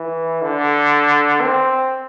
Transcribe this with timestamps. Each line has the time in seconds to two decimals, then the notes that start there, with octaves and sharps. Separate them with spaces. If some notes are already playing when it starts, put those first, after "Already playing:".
Already playing: E3
0.42 D3
1.42 C4